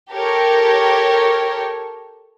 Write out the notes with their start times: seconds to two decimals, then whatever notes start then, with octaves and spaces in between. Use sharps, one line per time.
0.12 G4 A4 A#4 C#5